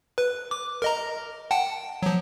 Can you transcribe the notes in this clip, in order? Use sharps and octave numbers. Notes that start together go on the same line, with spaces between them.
B4
D6
A#4 D#5 A#5
F#5 G5 A5
F3 F#3